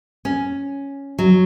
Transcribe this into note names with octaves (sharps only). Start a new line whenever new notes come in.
C#4
F#3